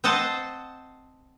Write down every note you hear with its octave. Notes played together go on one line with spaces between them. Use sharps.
C4 C5 D#5 F#5 A5